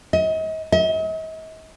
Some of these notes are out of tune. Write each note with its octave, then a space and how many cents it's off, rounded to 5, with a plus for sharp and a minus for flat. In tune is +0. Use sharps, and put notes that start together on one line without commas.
D#5 +35
D#5 +45